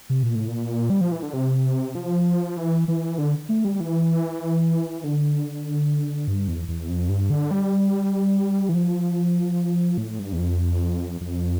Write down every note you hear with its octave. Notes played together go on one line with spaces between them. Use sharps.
C3
A#2
A2
A#2
G3
F3
E3
D3
C3
F3
E3
E3
D3
A3
G3
E3
D3
G2
E2
E2
F2
G2
D3
G3
E3
F3
A2
G2
E2
F2
F2